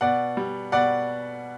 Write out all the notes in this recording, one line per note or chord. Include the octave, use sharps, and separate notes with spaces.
B2 D5 F#5
G3
B2 D5 F#5